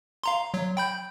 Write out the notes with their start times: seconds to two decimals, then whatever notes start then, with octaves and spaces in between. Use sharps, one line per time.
0.24 F5 A#5 C6
0.54 F#3
0.77 G5 B5 G6